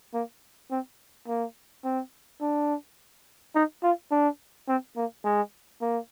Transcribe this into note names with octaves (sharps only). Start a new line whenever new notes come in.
A#3
C4
A#3
C4
D4
D#4
F4
D4
C4
A#3
G#3
A#3